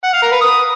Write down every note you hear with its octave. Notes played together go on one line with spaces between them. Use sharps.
F#5
F5
A#4
B4
D#6